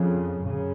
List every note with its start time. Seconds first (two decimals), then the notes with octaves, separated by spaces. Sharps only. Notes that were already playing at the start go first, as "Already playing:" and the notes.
Already playing: F2 C#3
0.41 F#2 C#3